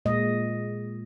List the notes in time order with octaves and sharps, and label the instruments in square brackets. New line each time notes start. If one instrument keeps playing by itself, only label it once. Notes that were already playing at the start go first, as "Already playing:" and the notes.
[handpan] A#2 G#3 D#5